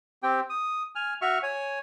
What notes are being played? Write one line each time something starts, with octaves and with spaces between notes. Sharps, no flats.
C4 G4 G5
D#6
G#5 F6
F#4 E5 C#6 F6
C#5 G#5